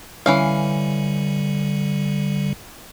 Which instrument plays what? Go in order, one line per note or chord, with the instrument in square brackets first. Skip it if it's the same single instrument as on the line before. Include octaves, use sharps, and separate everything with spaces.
[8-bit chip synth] D3 G3 [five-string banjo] E3 C#4 F5